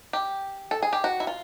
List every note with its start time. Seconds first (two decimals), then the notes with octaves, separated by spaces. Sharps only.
0.13 G4
0.71 A4
0.82 G#4
0.93 G4
1.04 F#4
1.20 E4
1.27 F4